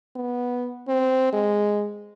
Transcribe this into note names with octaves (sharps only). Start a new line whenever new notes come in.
B3
C4
G#3